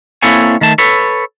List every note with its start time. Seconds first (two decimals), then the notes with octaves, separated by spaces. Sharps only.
0.22 A#3 C4 E4 A4 C#5 G#5
0.61 D#3 A3 A5
0.78 A4 B4 C#5